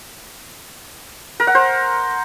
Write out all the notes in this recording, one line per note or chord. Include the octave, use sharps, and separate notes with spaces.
A#4
F#5
C5